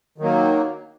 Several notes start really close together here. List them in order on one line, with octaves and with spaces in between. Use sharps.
D#3 F#3 A#3